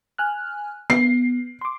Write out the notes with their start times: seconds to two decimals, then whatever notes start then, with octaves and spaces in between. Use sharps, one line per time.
0.18 G#5 F6 F#6
0.90 B3 C7
1.61 C6 D6